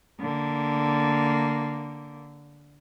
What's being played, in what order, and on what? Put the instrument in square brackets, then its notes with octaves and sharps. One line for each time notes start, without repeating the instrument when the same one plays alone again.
[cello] D3 A#3